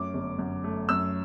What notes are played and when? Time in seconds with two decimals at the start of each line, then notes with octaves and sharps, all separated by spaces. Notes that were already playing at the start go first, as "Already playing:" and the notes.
Already playing: F#2 F#3 A3 D6
0.14 G1
0.39 F#2
0.64 A3
0.89 F#2 E6